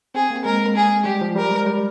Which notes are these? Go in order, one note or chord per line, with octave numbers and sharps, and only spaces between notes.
C4 G#4
A#3
G#3 A#4
G#4
G3 G4
F3
G3 A#4
G#3
G3